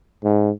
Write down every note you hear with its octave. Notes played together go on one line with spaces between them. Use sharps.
G#2